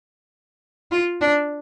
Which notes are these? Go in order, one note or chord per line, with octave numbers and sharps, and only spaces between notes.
F4
D4